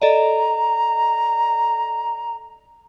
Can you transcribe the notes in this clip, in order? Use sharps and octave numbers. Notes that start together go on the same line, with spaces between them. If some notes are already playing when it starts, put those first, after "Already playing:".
A4 D5 D#5 A#5